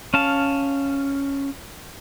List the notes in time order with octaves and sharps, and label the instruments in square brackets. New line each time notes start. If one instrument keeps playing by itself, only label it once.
[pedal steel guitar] C#4 F5 A5